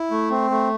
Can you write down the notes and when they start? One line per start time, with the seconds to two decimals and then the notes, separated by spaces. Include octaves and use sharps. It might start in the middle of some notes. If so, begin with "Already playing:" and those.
Already playing: E4
0.11 A3
0.30 C4
0.50 A3